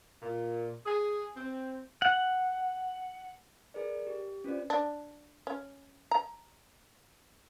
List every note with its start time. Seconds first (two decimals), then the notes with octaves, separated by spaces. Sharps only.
0.22 A#2
0.85 G#4
1.35 C4
2.02 F#5
3.74 G#4 A#4 B4 D5
4.07 G4
4.44 C#4 F4 B4 C5 D5
4.70 D4
5.47 C#4
6.11 A#5